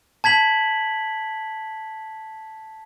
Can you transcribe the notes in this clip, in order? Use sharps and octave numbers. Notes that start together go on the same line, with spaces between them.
A5 G#6 B6 F#7